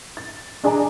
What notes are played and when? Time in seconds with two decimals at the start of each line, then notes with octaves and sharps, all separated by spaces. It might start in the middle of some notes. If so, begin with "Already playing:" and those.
0.17 A6
0.64 D4 G#4 D5 D#5 G#5 A#5